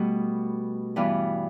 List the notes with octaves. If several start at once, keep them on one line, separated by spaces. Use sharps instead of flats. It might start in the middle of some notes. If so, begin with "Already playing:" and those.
Already playing: B2 G3 A3 B3
G2 E3 G3 B3